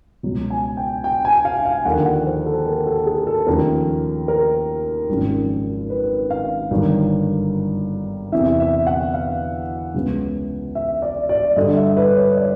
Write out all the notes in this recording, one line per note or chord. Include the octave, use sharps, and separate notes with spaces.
C#2 B2 F#3
G#5
G5
G5
G#5
F5
F5
D#2 D3 F3 F#5
F#5
C5
A4
A#4
A4
G#4
A4
D#2 C#3 F3 A3 A#4
A#4
G#1 F#2 C#3 F3
B4
F5
G1 G2 D#3 F#3
E2 C3 E3 E5
E5
F#5
F5
C#2 C#3 F#3 B3
E5
D5
D5
G2 D3 G3 D#5
E5
B4
C#5
D5